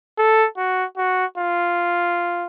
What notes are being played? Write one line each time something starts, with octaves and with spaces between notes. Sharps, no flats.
A4
F#4
F#4
F4